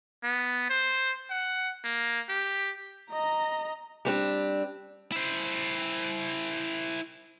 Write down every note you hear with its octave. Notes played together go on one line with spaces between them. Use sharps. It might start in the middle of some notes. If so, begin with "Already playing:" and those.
B3
C5
F#5
A#3
G4
D#5 A#5
G3 C4 D4
E4 C5